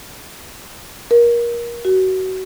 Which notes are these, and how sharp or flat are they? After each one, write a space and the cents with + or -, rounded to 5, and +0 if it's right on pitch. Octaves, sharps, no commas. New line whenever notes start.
A#4 +25
F#4 +25